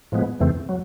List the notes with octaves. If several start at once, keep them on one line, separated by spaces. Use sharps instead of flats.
A2 F3 G#3 B3
F2 C#3 E3 A3 C4
F#3